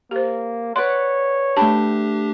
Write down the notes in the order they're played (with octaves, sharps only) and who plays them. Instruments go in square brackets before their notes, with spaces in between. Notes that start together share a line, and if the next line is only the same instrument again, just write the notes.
[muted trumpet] A#3 [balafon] G4 C5
[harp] B4 D5 F#5 [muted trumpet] C#5 [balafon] C6
[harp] A3 G5 [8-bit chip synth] D4 G4 [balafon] A5 B5